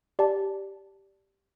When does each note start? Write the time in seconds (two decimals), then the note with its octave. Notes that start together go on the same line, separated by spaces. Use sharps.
0.19 G4 D5 A5